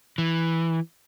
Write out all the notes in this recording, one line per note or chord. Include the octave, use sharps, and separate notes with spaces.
E3